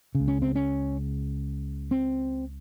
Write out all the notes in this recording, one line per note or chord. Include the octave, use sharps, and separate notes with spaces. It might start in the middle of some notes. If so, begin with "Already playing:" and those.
C#3
C#2
C#4
C4
C#4
C4